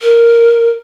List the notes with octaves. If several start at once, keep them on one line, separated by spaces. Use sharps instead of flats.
A#4